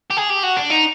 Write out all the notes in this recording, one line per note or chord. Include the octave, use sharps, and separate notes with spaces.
G4
G#4
G4
F#4
D4
D#4